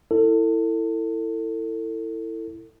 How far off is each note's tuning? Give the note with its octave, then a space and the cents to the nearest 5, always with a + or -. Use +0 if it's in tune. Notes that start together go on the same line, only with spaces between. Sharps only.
E4 +0 A4 +30